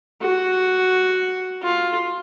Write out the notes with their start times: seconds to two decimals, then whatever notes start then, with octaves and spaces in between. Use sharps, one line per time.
0.22 F#4
1.63 F4